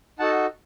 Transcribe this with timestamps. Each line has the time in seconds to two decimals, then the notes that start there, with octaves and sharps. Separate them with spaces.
0.19 D#4 F#4 A4 F#5 A5